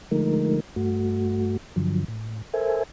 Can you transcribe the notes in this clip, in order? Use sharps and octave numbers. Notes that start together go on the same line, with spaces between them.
D3 F3 G#3 A3 D#4 A#4
G2 A3 F#4
G2 D3 F3 F#3
A2
A4 A#4 C5 E5 G#5